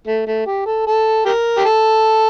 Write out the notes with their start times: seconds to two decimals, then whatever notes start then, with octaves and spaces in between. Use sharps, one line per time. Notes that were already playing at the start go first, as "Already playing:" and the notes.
0.07 A3
0.27 A3
0.46 G4
0.66 A4
0.87 A4
1.26 G4 A#4
1.58 G4
1.65 A4